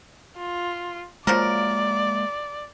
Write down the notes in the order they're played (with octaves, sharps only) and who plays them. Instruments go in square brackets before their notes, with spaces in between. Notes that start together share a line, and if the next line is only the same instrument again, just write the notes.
[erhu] F4
[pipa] F3 F#3 A#4 [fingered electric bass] G#3 A#3 [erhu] D5